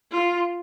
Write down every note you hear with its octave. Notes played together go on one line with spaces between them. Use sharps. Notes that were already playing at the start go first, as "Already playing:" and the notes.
F4